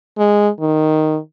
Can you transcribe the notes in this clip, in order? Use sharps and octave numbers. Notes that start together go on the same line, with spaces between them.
G#3
D#3